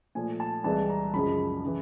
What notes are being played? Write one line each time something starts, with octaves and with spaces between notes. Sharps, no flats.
A#2 F3 A3 G#5
A5
C2 C3 E3 G#3 A5
A#5
F#2 C#3 F3 G#3 B5
B5
C#3 E3